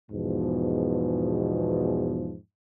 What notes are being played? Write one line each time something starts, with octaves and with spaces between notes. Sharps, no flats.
E2 G#2 B2 F3